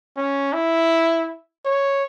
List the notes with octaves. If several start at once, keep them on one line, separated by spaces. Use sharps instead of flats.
C#4
E4
C#5